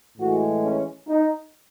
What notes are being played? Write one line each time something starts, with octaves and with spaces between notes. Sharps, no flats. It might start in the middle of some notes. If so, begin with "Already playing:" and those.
A2 E3 G#3 F#4
C#4
D#4